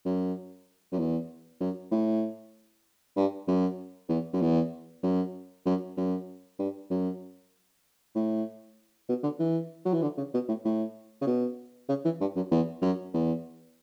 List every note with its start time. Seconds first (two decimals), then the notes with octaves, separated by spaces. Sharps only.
0.05 F#2
0.92 F#2
0.98 E2
1.60 F#2
1.91 A2
3.16 G2
3.48 F#2
4.09 E2
4.33 F#2
4.42 E2
5.03 F#2
5.66 F#2
5.97 F#2
6.59 G2
6.90 F#2
8.15 A2
9.09 B2
9.23 D3
9.39 E3
9.85 F#3
9.93 E3
10.02 D3
10.18 C#3
10.34 B2
10.48 A2
10.65 A2
11.21 C#3
11.27 B2
11.89 C#3
12.05 E3
12.21 G2
12.36 F#2
12.51 E2
12.82 F#2
13.14 E2